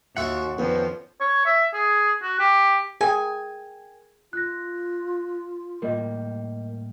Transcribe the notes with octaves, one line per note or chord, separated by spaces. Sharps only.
D#2 F4 F#4 E5 F#5 C#6
F2 D#3 F3 B3 C#4
C#5
E5
G#4
F#4
G4
G#4 A#4 G5 G#5
F4 F#6 A#6
A2 G3 A#3 A#4 D#5